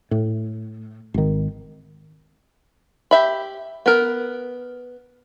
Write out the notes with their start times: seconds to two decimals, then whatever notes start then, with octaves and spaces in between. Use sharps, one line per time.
0.11 A2
1.14 G#1 D#3
3.11 G4 E5 B5
3.86 B3 A#4